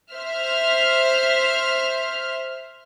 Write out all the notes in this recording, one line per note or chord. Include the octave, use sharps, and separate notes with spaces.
C5 E5 F6